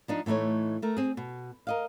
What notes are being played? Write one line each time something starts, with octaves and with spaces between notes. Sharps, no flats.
F3 D4 D#4
A2 E3 A3 D#4 C#5
A3 A#4
C4 G#4
B2
A#4 D#5 F5